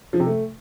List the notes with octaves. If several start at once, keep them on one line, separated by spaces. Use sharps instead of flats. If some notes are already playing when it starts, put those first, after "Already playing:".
F3
C3
A3